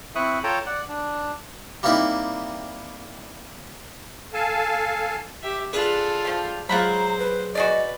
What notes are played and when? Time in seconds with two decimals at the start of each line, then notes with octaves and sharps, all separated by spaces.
0.15 C4 E4 E5 C#6 D#6 F#6
0.44 F4 A4 C#5 G5 A5 A#5
0.66 D5 F#5 F#6
0.89 D4
1.83 G3 A#3 C4 D#4 E4
4.33 A4 F5 G#5 A5
5.43 G4 E5
5.73 D4 F4 G#4 A4 B4
6.25 F3 G4
6.69 F#3 G#3 F4 C5 F#5 A#5 B5
7.19 B4
7.55 F#4 G#4 B4 D5 D#5